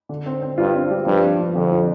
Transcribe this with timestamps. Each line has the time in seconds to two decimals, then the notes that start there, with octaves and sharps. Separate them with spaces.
0.09 D3
0.26 C4
0.42 C4
0.58 G2 F4
0.74 C4
0.91 G3
1.06 G2 F3
1.23 C4
1.39 F3
1.55 F2 D3
1.72 F3